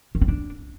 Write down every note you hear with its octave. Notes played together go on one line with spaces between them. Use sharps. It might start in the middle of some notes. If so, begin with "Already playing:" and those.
D#3
C4
D4